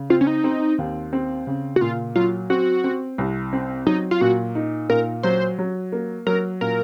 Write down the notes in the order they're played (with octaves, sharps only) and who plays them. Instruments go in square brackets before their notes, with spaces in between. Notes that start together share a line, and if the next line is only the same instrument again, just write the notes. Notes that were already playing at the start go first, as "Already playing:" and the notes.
Already playing: [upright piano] C#3
[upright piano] C4 [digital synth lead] F4
[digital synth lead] C#4
D#4
[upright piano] C4
D#2
C4
C#3
[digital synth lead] F#4
[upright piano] A#2 [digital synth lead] F4
[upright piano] F#3 [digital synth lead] F4
[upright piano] C4 [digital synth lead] F#4
[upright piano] C4
C2
C4
[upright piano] F#3 [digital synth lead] D#4
[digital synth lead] F4
[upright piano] A#2 [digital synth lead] F#4
[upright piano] D#4
[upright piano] A#2 [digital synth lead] A#4
[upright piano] F#3 [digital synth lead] C5
[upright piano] F#3
A#3
[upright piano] F#3 [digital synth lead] A#4
[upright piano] A#2 [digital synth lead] A#4